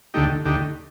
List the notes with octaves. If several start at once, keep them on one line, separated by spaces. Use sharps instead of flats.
D2 D3 A3 D#4 G4
D2 D3 A3 D#4 G4